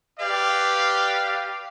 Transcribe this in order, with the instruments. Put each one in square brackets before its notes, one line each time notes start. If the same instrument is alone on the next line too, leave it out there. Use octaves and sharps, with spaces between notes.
[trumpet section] G4 B4 D5 F5